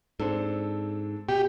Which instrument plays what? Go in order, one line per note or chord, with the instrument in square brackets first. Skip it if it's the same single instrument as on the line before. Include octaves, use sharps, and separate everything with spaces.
[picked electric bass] G#2 [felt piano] C4 D4 A4
[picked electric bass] B2 [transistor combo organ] G4